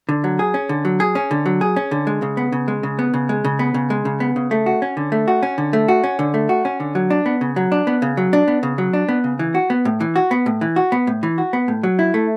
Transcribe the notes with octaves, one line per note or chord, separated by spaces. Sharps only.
D3
F#3
G#4
C#4
D3
F#3
G#4
C#4
D3
F#3
G#4
C#4
D3
G#3
C#3
B3
C#3
G#3
C#3
B3
C#3
G#3
C#3
B3
C#3
G#3
C#3
B3
C#3
A3
F#4
C#4
D3
A3
F#4
C#4
D3
A3
F#4
C#4
D3
A3
F#4
C#4
D3
F#3
D4
B3
C#3
F#3
D4
B3
C#3
F#3
D4
B3
C#3
F#3
D4
B3
C#3
E3
F#4
B3
A2
E3
F#4
B3
A2
E3
F#4
B3
A2
E3
F#4
B3
A2
F#3
E4
A3